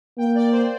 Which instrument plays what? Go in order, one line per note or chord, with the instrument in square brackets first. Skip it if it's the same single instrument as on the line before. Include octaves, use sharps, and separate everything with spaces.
[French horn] A#3 [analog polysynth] G5
[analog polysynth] D5
C5